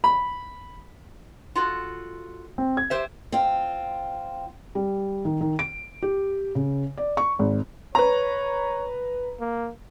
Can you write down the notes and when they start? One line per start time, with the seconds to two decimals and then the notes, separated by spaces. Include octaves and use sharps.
0.04 B5
1.55 F4 F#4 A4
2.58 C4
2.77 G#6
2.90 G4 C5 E5
3.32 C4 F4
4.75 G3
5.25 D#3
5.41 D#3
5.59 D7
6.02 G4
6.55 C#3
6.97 D5
7.17 C#6
7.39 G#1
7.95 B4 C#5 A#5
9.40 A#3